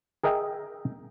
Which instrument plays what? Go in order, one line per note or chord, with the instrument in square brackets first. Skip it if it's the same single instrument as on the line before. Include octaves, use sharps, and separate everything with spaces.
[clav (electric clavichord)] G#4 A#4 D#5 E5 G5